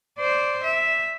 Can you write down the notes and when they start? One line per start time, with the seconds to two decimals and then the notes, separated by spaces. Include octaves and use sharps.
0.18 C5 D5
0.64 E5